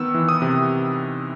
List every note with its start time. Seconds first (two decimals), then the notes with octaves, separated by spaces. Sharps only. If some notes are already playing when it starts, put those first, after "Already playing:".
Already playing: D#3 B3 E6
0.14 E3
0.29 D#6
0.42 C3